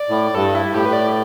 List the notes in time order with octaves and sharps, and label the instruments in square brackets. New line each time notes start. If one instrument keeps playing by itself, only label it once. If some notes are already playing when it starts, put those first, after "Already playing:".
Already playing: [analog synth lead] D5
[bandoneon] A2
[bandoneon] G2 [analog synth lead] A4
[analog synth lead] E4
[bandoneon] A2 [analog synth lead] G4
[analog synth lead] B4
D5